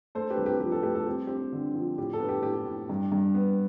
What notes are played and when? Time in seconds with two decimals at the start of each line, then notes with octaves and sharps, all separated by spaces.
0.15 A3 A4 C5
0.30 G4 B4
0.37 C2
0.46 G4 B4
0.60 F3 G4 B4
0.72 A4
0.83 A3 G4 B4
0.95 A4
1.06 C4 G4
1.27 C4 G4
1.53 D3
1.75 F3
1.98 A2 G4
2.13 A4
2.20 B3
2.29 G4
2.43 A2 G4
2.66 A2
2.89 G2
3.12 G2
3.35 B3